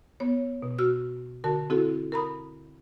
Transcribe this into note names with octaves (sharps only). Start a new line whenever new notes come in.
B3 C#5
B2
F#4 E6 F6
D3 F#4 A#4 A5
C4 E4 F#4 A4
A#4 A#5 B5 D#6